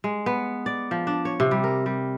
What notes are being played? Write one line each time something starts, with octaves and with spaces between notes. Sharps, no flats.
G#3
B3
D5
F3
D4
C#5
C3
G3
A#4
G3